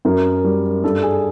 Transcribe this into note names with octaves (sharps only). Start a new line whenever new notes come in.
F#2 A#4
G3
G2 A4
G#4